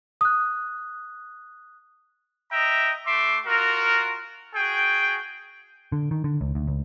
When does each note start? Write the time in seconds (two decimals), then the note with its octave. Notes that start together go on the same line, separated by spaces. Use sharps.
0.21 D#6 F#6
2.52 D#5 E5 G5 A#5
3.07 A3 E5 C6 D6
3.46 F4 F#4 A#4
4.55 F#4 G#4 G5
5.92 D3
6.11 D#3
6.24 D3
6.41 C#2
6.55 D2
6.67 C#2